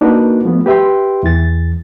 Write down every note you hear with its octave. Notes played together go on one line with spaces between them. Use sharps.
A#3 D4 D#4 F#4 A#4 B4
F3 A3 B3
G4 B4 E5 G5 C6
E2 E3 A6